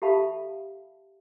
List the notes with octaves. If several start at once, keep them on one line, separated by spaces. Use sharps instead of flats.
G4 A4 E5 F5 A5 B5